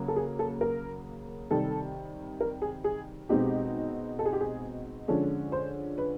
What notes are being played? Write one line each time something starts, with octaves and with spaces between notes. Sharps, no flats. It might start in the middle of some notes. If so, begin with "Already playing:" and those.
Already playing: C#3 F#3 A#3
A4
G#4
A4
A#4
C3 D#3 G3 A4
A#4
G#4
G#4
B2 G#3 C4 D#4 G4
A4
G#4
G4
G#4
D3 F3 G#3 C#4 A4
C5
B4